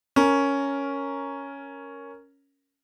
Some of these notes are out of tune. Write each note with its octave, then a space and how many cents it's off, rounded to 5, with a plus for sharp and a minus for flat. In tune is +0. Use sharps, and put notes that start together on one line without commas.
C#4 +0 A#4 +0